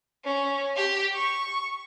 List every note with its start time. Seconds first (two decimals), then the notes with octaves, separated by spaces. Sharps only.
0.25 C#4
0.77 G4
1.15 C#6